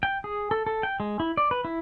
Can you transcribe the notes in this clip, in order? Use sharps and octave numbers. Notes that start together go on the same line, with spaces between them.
G5
G#4
A4
A4
G5
G#3
E4
D5
B4
E4